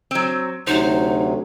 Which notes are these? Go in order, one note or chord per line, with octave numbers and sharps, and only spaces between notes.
F#3 C4
D2 C3 F#3 D#4 C5